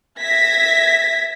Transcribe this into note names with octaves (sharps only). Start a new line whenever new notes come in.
E5 G#6 A#6 B6